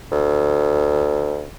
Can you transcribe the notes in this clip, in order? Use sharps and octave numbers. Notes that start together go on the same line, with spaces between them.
D2